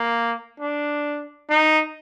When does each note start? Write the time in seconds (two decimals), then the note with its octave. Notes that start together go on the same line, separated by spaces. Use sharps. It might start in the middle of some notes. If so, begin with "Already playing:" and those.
Already playing: A#3
0.60 D4
1.50 D#4